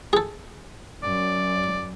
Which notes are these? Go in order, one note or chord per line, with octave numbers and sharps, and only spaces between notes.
G#4 A4
F#2 D5